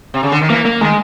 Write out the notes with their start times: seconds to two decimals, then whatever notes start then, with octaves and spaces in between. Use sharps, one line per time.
0.14 C3
0.23 C#3
0.32 D3
0.41 D#3
0.50 E3 A#3
0.66 A#3
0.81 D#3 G#3